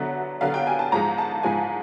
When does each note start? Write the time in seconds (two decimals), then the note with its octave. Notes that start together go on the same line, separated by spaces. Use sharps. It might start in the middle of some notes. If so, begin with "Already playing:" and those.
Already playing: D3 F#3 B3 E5
0.41 D3 F#3 B3 F5
0.54 G5
0.67 G#5
0.79 A5
0.92 G#2 F3 G#3 A#5
1.18 A5
1.43 G#2 F3 G#3 G#5